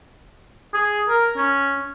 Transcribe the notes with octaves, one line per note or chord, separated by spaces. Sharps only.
G#4
A#4
C#4